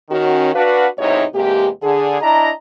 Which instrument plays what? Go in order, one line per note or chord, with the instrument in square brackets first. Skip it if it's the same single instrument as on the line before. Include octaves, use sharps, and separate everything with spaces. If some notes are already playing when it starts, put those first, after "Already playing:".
[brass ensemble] D#3 C#4 F#4
D4 F#4 B4 F5
B1 G#2 C3 D#4 E4 C#5
E2 C3 G#3 A#3 G4
D3 G#4
D4 E4 D#5 A5 A#5